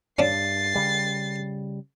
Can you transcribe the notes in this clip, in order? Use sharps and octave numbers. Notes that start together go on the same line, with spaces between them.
G2 C#4 D4 A6 C7
C#3 G3